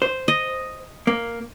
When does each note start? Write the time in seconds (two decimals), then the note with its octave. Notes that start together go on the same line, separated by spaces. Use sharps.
0.02 C5
0.28 D#5
1.07 A#3